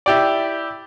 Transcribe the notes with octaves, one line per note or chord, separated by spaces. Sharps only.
E4 G4 D5